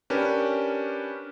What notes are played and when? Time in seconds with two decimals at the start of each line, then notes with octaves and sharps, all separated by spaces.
0.10 C#4 D4 G4 A#4 B4